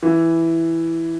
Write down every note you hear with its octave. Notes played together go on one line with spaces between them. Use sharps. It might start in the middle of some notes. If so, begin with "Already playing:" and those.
E3